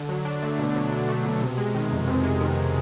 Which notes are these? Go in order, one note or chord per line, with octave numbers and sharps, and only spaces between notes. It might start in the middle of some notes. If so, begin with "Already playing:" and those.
Already playing: D3
F#3
D4
A3
B2
F#3
D4
A3
B2
C3
G#3
D#3
F2
C3
G#3
D#3